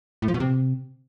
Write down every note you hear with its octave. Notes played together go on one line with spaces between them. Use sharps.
A2
F3
B2
C3